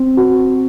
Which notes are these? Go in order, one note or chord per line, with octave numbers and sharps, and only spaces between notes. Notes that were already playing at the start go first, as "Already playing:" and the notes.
Already playing: C4
F#4